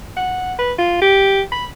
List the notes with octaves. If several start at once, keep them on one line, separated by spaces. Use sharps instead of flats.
F#5
B4
F4
G4
B5